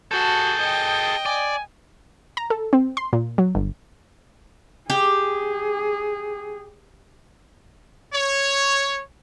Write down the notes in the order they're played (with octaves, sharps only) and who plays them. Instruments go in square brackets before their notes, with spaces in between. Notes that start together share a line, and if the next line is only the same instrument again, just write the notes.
[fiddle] F#4 A5 [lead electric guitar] G#4 A4 [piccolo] G6
[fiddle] D#5 G5
[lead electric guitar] D5 [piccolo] G#5
[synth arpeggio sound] A#5
A4
C4
C6
A#2
F#3
G1
[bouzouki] G4 [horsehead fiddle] G#4
[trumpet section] C#5